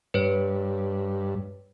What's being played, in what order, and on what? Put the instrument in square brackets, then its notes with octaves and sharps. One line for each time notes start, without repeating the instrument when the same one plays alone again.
[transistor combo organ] G2 [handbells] B4 C#5